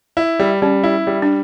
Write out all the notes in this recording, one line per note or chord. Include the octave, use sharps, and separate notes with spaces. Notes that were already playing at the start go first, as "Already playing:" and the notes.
E4
G3
G3 C#4
E4
G3
D4